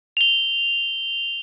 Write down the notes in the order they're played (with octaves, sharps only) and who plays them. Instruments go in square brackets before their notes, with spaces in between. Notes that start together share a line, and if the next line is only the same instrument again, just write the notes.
[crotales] F7 G7